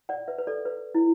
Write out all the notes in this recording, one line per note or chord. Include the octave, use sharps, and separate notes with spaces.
D5 F#5
B4 E5
B4
A4 D5
B4
E4